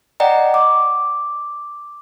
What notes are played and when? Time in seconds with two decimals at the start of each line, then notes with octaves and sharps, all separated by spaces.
0.20 D5 D#5 F#5 G5 A#5
0.54 D6